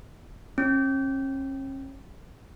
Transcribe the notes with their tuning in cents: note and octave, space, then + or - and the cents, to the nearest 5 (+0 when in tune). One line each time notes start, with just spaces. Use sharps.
C#4 -40